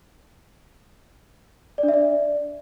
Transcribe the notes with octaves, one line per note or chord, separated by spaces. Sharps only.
D5
D4
E5
D5